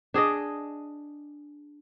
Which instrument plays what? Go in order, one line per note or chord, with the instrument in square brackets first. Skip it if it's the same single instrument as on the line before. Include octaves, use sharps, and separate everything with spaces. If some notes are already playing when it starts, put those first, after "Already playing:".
[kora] D4 G#4 D5 D#5